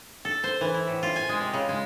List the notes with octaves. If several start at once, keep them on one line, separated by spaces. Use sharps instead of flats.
A4
C5
E3
E4
A2
F4
G#5
G#3
C3
C#3
G#3